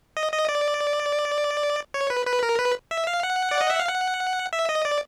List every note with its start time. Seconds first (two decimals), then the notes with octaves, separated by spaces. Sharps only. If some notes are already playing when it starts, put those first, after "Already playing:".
0.17 D#5
0.32 D#5
0.49 D5
1.94 C#5
2.10 B4
2.26 B4
2.43 A#4
2.59 B4
2.91 E5
3.07 F5
3.23 F#5
3.51 D5
3.61 D#5
3.70 E5
3.79 F5
3.88 F#5
4.53 E5
4.69 D#5
4.85 D5